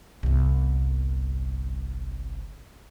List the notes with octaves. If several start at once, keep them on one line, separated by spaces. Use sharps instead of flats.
G1 C2